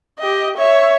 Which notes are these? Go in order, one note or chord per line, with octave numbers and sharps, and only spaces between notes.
G4 D#5
C#5 E5